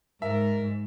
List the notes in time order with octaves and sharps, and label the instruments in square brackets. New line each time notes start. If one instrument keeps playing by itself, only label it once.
[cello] G#2 [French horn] A#4 [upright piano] E5